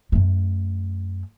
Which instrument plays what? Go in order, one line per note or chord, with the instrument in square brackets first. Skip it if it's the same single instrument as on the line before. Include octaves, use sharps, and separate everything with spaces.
[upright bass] F#2 A3